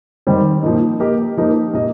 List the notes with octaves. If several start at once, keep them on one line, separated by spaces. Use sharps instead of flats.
D#3 G3 C4
A#2 F3 A#3 D#4
A#3 G4 A#4 D#5
F3 A#3 D#4 G4 A#4
A#2 A#3 G4 D#5